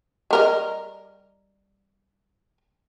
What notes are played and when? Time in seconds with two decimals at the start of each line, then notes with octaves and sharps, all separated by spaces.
0.31 G3 A#4 D#5